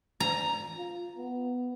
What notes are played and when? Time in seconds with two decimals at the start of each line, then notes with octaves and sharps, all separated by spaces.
0.20 A#5
0.77 F4
1.17 B3